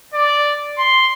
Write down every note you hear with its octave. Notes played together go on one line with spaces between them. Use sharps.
D5
C6